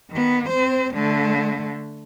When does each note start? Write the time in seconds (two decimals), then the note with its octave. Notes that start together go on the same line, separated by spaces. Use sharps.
0.11 D#3 B3
0.49 C4 C5
0.94 D3 A3